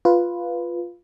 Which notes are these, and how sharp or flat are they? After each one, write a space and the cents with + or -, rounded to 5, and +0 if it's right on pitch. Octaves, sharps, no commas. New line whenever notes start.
F4 +0 B4 +0